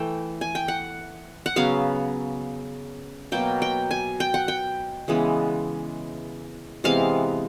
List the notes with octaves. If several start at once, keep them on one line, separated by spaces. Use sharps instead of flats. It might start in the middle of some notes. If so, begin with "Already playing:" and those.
Already playing: E3 A3 G5
G#5
G5
F#5
F#5
C#3 F#3 B3 F5
B2 F#3 A#3 G5
G5
G#5
G5
F#5
G5
C#3 E3 G#3 B3
C3 E3 G#3 B3 F5